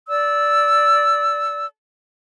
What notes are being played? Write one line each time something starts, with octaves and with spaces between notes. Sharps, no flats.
D5 E6